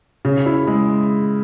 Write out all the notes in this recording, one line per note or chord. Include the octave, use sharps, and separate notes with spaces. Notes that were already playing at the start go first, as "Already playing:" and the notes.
C#3
E4
G#3